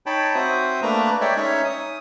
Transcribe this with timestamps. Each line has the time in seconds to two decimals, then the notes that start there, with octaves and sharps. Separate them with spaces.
0.06 D#4 C#5 G5 A5 B5
0.35 C4 F#4 C5 E5 D#6
0.83 A3 A#3 D4 B4 A#5
1.21 G#3 C#5 D5 E5 G5
1.37 C#4 D#4 C#5 E5
1.65 D#6